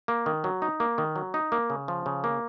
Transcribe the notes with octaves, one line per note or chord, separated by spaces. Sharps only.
A#3
D#3
F#3
D#4
A#3
D#3
F#3
D#4
A#3
C#3
F3
C#3
A#3